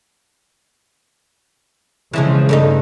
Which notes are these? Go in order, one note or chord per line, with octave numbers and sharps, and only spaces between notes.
C#3 E3 F3 G#3
G2 A3 D#4